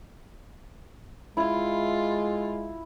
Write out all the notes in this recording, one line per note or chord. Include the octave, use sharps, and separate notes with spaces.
G#3 E4 F4